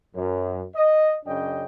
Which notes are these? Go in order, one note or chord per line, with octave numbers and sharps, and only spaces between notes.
F#2
D#5
F#2 C#3 D4 D#5 G5